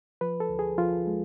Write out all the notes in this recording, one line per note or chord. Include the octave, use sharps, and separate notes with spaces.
F3 B4
A4
D2
G#4
F3 F4
G#3